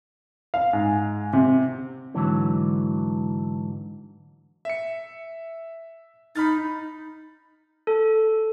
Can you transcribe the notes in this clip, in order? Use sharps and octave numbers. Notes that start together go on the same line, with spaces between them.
F5
G#2
C3
G#2 D3 E3 F#3
E5 C#7
D#4 B5 F6 A6
A4